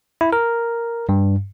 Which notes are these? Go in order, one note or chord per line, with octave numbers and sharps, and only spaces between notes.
E4
A#4
G2